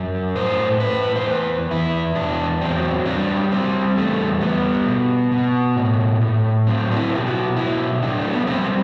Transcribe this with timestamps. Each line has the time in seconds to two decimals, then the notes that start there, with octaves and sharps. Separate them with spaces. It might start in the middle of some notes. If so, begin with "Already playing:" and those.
Already playing: F#2
0.36 A2 C5
0.80 A2 B4
1.16 C5
1.26 E2 B4
1.71 E2 E4
2.15 E2 D4
2.61 F#3 C4
3.06 G3 D4
3.51 G3 C4
3.96 E2 A3
4.41 G3 B3
4.86 B2
5.32 B2
5.76 A2
6.21 A2
6.67 F#3 C4
6.91 D4
6.97 E4
7.11 B2
7.16 G4
7.27 F#4
7.57 F#3 E4
8.02 F#3 D4
8.19 A3
8.33 B3
8.47 G3 C4